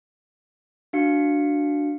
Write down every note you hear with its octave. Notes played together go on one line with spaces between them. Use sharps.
D4 F#4 F5 C#7